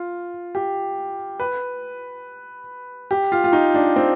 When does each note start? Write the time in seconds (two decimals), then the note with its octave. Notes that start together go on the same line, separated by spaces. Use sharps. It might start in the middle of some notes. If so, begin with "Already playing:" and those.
Already playing: F4
0.55 G4
1.40 B4
3.11 G4
3.32 F4
3.44 F4
3.53 D#4
3.74 D4
3.96 C4